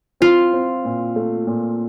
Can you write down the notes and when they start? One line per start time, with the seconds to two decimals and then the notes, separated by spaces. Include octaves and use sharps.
0.20 C4 F4
0.53 C4
0.85 A#2
1.16 A3
1.47 A#2